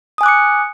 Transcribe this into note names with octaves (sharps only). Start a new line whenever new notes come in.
G#5 D6 D#6 F#6 C#7